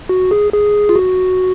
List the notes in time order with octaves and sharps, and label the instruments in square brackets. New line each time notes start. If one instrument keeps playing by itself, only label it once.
[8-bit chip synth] F#4
G#4
G#4
F4
F#4